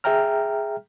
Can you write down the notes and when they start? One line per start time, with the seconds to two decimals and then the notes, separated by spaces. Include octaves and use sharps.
0.04 G#4 E5 G5 A#5 F6